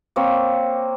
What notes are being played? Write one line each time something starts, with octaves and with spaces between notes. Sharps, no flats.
A#3 C4 C#5